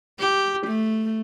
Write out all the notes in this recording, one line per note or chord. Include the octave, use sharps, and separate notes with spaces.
G4
A3